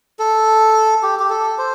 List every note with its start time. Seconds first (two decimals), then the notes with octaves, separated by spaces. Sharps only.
0.19 A4
1.03 G4
1.20 G4
1.30 A4
1.58 C5